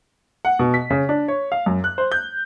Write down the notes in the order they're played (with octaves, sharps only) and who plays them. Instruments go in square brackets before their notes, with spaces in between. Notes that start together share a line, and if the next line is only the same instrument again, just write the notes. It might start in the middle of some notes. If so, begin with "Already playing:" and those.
[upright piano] F#5
B2
B6
C#3
D4
C#5
F5
F#2
F#6
C5
G6